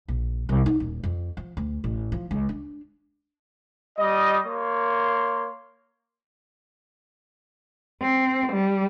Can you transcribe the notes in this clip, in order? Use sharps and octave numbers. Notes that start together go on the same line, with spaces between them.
A#1
C2
D#4
D#1
F2
F3
D2
A1
F3
C#2
D4
G3 D#5
A#3 C#5 C6
C4
G3